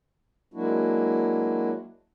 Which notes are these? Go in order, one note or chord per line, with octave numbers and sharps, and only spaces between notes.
F#3 G#3 A#3 D4 E4 F#4